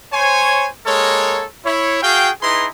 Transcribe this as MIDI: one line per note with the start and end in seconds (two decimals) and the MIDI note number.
0.13 0.68 72
0.13 0.68 73
0.13 0.68 80
0.86 1.45 56
0.86 1.45 58
0.86 1.45 69
0.86 1.45 70
0.86 1.45 73
1.65 2.00 64
1.65 2.00 73
2.02 2.30 66
2.02 2.30 68
2.02 2.30 77
2.02 2.30 79
2.42 2.67 63
2.42 2.67 64
2.42 2.67 68
2.42 2.67 71
2.42 2.67 82
2.42 2.67 84